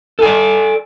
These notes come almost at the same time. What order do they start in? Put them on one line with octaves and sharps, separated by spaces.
A4 G#5 D5